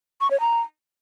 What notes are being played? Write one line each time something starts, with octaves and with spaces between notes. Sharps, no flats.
C#6
C#5
A#5